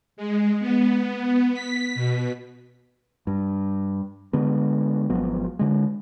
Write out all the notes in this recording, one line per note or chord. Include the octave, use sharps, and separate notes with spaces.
G#3
B3
B6
B2
G2
D3 G#3 B3
G#1 F3 F#3 B3
D3 G#3